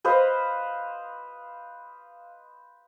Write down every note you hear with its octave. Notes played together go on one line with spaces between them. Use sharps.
B4 C5 D#5 F5